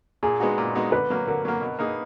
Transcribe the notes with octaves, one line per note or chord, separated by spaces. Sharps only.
A#2 G#4
G#3 B3 D#4 F#4
A#2
G#3 B3 D#4 F#4
D3 B4
F#3 A#3
D3 A#4
F#3 A#3
B2
A#3 D#4 G#4